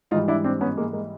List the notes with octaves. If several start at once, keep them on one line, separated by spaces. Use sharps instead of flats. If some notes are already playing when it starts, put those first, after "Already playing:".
G#2 E3 G3 D#4 F4
D4 E4
C4 D4
B3 C#4
G#3 A#3
G#3 A#3